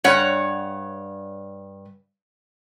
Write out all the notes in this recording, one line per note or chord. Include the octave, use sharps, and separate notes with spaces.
G2 C#5 F#5